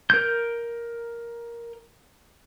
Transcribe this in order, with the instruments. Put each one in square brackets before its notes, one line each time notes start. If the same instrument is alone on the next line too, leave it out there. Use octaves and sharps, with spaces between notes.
[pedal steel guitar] A#4 G6